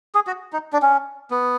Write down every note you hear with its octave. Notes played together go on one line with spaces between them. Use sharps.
G#4
F#4
D#4
D4
C#4
B3